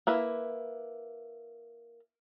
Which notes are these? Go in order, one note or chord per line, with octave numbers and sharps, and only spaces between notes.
A#3 E4 B4